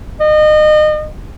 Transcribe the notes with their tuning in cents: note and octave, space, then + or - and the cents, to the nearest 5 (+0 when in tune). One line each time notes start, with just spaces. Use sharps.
D#5 -30